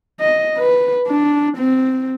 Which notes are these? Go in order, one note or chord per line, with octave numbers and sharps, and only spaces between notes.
D#5
B4
D4
C4